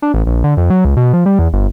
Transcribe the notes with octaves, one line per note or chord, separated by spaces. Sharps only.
D4
A1
A#1
D3
F2
F#3
C#2
B2
F3
G3
E2
G1